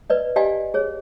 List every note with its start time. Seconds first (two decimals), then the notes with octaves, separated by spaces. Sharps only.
0.10 B4 D5 D#5
0.36 G4 D5 D#5 F5 G#5
0.74 G#4 C#5